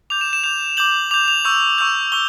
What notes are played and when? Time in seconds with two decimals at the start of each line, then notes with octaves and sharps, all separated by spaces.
0.10 D6 G6 F7
0.21 E7
0.33 E7
0.44 D6 G6 F7
0.77 D6 G6 F#7
1.11 D6 G6 F7
1.28 F7
1.45 C#6 E6 G6
1.78 C#6 E6 G6
2.12 C#6 E6 G7